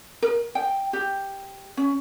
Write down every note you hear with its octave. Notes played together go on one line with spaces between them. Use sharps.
A#4
G5
G4
C#4